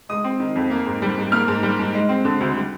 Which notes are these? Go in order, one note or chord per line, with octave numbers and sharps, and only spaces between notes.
G#3 D#6
C4
D#3
F2
A#3
G#2
G3
G#2
A#3 F6
G#2
G3
G#2
G#3
C4
D3
D2
G3